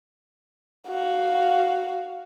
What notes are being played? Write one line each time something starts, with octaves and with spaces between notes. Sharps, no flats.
F#4 F5